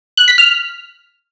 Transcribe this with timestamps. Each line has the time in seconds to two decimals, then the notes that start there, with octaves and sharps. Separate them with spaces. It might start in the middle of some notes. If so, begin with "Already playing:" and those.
0.17 F#6
0.28 B6
0.38 F6